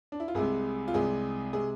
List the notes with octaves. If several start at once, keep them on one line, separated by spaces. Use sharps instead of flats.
D4
E4
F4
C2 C3 G#3 G#4
F4
C2 C3 G#3 G#4
C3 G#3 G#4